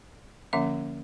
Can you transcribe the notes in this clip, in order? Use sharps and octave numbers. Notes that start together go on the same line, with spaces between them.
D3 F3 A#3 C#4 E5